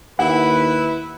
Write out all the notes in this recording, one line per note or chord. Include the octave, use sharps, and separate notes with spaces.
D#2 E4 B4 F#5